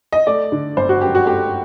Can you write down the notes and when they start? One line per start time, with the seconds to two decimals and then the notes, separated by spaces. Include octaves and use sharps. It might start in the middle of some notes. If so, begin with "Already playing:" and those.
0.12 D#5
0.27 A3 D5
0.52 D3
0.77 G1 C5
0.89 F#4
1.01 F#2 G4
1.15 F#4
1.26 A3 G4